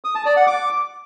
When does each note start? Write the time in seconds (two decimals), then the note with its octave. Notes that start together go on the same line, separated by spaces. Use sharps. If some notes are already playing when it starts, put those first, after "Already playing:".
0.04 D#6
0.15 A5
0.26 D5
0.36 F#5
0.47 D6